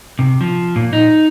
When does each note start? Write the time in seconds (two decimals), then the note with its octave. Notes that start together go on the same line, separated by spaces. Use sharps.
0.19 C3
0.41 F3
0.76 A#2
0.93 D#4